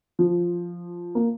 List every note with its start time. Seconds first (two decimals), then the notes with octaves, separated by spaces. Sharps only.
0.19 F3
1.15 A#3